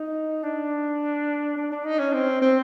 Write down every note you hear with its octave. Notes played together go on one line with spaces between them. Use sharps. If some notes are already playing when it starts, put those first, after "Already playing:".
Already playing: D#4
D4
D4
D4
D#4
C#4
C4
C4